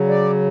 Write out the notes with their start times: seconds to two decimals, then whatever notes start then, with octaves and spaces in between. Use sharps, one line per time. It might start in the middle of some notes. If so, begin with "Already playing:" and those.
Already playing: C#3 F#3
0.08 D5